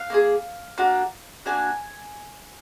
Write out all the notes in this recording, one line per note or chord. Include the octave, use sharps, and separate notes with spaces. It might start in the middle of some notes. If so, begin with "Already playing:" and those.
Already playing: F5
A#3 D4 G#4
A#3 D4 F#4
A#3 D4 F#4 G#5